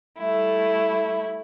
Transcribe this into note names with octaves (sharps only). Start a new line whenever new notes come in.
G3 A3 E4